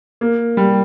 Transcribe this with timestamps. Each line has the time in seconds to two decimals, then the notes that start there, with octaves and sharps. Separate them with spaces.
0.21 A#3
0.57 G3